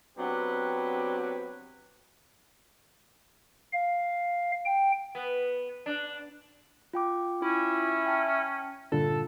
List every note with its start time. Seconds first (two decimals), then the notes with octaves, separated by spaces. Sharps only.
0.17 F#3 B3 C4 D4 G4 B4
3.73 F5
4.66 G5
5.15 B3
5.86 D4
6.93 F4 G5 D6
7.42 C#4 E4
8.06 G5 A5 F6
8.92 G2 A#2 D3 F4 A4